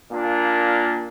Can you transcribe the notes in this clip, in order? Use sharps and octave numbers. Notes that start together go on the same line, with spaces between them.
A#2 A#3 D4 F4